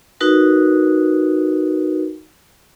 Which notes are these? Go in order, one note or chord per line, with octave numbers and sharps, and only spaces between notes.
D#4 F#4 A#4 B4